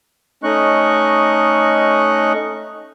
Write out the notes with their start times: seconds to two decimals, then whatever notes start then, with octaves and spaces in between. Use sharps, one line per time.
0.44 A3 C#4 D#4 D#5 C#6 F#6